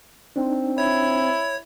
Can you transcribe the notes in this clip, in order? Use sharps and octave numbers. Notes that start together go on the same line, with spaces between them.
C4 D4 D#4
E4 C#5 G#6